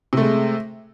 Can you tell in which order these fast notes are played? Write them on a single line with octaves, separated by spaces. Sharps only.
C3 A3 G#3